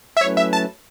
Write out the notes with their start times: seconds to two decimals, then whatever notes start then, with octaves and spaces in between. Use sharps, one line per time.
0.17 E5
0.21 F#3 A3 C#4 E4 B4 C#5
0.37 E5
0.53 A5